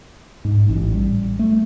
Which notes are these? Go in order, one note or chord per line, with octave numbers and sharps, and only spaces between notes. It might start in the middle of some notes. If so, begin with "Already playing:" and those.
G#2
A1
G3
A3